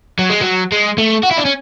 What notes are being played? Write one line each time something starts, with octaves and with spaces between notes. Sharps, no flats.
F#3
G#3
F#3
G#3
A3
F#4
E4
D4
C#4